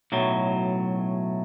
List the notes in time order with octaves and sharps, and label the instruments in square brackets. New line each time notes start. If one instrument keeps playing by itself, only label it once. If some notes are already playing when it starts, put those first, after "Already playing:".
[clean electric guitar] B1 A2 F#3